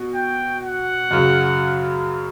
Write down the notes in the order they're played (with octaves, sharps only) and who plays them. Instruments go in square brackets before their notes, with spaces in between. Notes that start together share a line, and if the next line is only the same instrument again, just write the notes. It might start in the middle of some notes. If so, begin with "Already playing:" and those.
Already playing: [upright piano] B2
[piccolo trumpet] G5
F#5
[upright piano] F#2 C#3 F#3